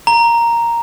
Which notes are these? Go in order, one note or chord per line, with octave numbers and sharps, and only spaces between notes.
A#5